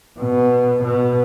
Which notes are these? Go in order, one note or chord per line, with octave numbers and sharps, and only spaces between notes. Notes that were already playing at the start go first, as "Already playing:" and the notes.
B2
B2